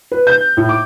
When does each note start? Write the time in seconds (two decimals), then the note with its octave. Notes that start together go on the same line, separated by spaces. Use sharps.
0.12 B4
0.27 G6
0.57 A2
0.69 D6